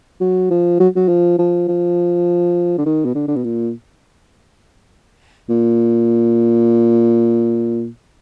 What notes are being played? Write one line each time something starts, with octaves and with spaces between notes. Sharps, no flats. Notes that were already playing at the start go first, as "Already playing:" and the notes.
F#3
F3
F#3
F#3
F3
F3
F3
D3
D#3
B2
D3
D3
B2
A#2
A#2